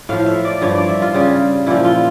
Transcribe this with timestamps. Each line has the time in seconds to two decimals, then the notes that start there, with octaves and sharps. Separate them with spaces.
0.09 A2 F3 F5
0.26 E5
0.45 D5
0.61 G2 F3 C#5
0.75 D5
0.89 E5
1.02 F4
1.14 C#3 G3
1.66 A#2 F3 E4
1.84 F4